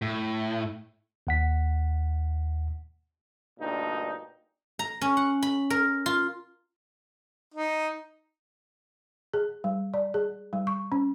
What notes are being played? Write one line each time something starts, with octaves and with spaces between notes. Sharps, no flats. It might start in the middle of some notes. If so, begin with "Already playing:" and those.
A2
D#2 F#5 B6
D2 G2 A#2 D#4
A#5
C#4
F#5
B5
A#4
F4
D#4
G#4
G3
D5
G#4
G3
C#6
C#4